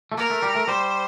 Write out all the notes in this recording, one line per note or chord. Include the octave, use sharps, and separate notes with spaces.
A3
A#3 A#4
A3
G3
A3
G3 C5